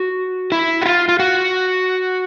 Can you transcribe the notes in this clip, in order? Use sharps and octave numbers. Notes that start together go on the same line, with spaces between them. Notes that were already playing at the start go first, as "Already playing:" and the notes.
Already playing: F#4
E4
F#4
F4
F4
F#4